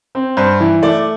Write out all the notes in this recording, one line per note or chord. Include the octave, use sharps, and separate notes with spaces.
C4
G2 C5
E3
A3 D5